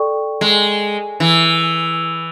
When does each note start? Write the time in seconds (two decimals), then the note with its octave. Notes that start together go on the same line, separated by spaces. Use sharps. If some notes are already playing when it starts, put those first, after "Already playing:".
Already playing: A4 D5 G5 C#6
0.41 G#3
1.20 E3